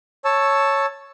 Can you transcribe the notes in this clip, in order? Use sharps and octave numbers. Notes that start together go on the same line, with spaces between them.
C#5 A5 E6